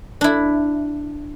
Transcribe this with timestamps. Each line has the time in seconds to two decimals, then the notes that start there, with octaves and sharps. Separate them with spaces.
0.21 D4 E4